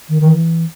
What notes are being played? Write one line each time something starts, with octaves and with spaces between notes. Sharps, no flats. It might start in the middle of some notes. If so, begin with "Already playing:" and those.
D#3
D#3 E3